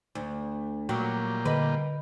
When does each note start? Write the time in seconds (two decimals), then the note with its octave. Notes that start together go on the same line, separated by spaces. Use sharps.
0.15 D2
0.89 A#2 F#3 G3 A#3 G5
1.45 D3 B4 D#5 B5